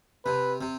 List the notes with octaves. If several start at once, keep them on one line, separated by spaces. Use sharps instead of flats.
C3 B4
C3